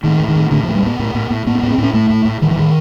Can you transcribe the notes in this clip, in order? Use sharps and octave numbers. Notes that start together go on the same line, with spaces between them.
A2 D#3
A2
D#3
A2
A2 D3
F3
A2
G3
A2 B3
A2
A2
A2
A2 B3
B3
A2
C4
A2 C#4
A2 A3
A2
A2
A2 D#3
E3
A2 D#3